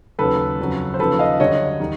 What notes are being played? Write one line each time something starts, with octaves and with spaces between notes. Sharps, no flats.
D#2 C#3 F#3 A4 B4
F2 C#3 F#3
C5
D#2 C#3 F3 A4 B4
D#5 F5
F#2 D3 G3 C#5 D#5
D#3 G3